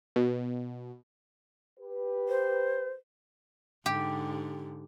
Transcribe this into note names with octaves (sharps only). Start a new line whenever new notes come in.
B2
G4 B4
C5
G#2 D3 G4